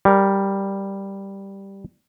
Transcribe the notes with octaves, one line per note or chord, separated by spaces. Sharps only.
G3 A#4